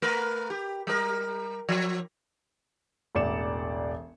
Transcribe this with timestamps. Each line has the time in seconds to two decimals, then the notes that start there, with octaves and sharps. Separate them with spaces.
0.02 A3 A#4 B4
0.50 G4
0.87 G3 A#4
1.69 F3
3.15 E1 A1 D5 C#7 E7